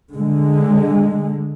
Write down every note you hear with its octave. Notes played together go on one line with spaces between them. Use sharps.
D3 G#3